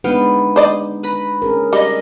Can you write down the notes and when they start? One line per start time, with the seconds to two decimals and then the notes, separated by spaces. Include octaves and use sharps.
0.04 G#3 B3 D4 D#4 F5 G5
0.56 C5 D5 D#5
1.03 B4 A#5 B5
1.42 C#4 G#4 A#4
1.73 G3 D#5